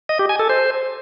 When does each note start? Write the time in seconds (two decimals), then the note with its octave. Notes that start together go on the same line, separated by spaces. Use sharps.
0.09 D#5
0.19 G4
0.29 G#5
0.39 A4
0.49 C5